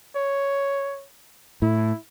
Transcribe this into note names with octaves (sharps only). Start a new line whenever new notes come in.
C#5
A2 E4